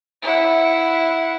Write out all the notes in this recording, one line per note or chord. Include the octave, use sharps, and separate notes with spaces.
E4 F#5